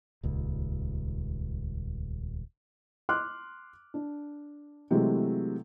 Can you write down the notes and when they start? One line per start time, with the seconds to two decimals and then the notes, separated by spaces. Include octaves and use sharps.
0.23 D#1 C#2
3.09 C6 D6 F6 F#6
3.94 D4
4.91 C3 E3 F#3 G#3 A3